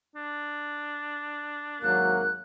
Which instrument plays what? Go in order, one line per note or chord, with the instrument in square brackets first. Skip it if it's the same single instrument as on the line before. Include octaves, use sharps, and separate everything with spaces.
[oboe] D4
[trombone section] G#1 F#3 A#3 [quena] F#6